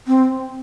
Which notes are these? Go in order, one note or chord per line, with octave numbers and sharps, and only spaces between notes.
C4